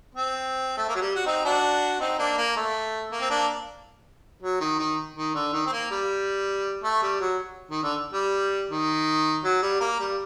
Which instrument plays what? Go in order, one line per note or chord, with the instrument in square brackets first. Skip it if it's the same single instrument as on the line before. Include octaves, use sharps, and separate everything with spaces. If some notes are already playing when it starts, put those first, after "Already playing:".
[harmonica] C4
A3
A#3
F#3
G3
F#4
C4 D#4
D4 F#4
C4 D#4
A#3 D4
A#3
A3
A#3
C4
A#3 D4
F#3
D#3
D#3
D#3
D3
D#3
C4
A#3
G3
A3
G3
F#3
D#3
D3
G3
D#3
F#3
G3
A#3
G3